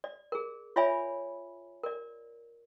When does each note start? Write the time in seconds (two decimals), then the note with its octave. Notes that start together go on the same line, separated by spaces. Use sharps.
0.04 D5
0.32 G#4 A#4
0.76 F4 C#5 D5 E5 G#5 B5
1.83 A#4 D5